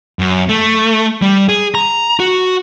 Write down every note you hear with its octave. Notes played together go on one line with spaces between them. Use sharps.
F#2
A3
G3
G#4
A#5
F#4